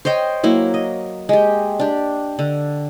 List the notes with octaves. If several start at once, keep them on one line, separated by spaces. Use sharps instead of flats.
C5 C#5 D#5 G5
F#3 A#3 E4
D#5
G#3 G4
D4 G4
D3